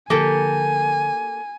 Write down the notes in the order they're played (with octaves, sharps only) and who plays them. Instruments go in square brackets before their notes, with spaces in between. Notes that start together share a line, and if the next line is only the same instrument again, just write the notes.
[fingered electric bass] D3 F3 [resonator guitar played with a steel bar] A#3 G4 A4 [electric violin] G#5